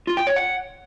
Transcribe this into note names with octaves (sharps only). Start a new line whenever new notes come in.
F4
G5
C#5
F#5